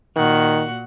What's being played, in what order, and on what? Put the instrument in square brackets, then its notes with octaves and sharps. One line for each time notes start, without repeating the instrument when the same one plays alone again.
[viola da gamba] A#2 F#4 [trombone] D#3